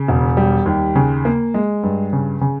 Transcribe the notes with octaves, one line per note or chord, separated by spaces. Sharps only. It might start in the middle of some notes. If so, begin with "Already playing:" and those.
Already playing: C#3
E1
G3
D#2
C#3
A#3
G#3
G2
C#3
C#3